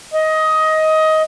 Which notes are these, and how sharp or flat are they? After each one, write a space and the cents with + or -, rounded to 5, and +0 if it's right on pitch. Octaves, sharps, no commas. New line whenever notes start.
D#5 +15